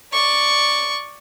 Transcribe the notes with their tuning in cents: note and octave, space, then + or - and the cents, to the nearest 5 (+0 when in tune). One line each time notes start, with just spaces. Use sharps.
D5 +0 C#6 +0